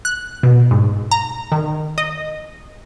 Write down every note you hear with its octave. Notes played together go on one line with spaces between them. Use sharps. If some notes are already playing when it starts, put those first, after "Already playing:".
F#6
B2
G#2
A#5
D#3
D#5